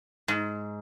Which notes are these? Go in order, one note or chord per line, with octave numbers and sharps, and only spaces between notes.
G#2